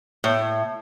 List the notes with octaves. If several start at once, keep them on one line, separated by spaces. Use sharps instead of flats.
A2